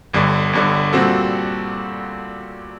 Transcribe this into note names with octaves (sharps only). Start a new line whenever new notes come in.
G1 G2 D3
G1 G2 D3
A#2 G3 C4 F#4 A4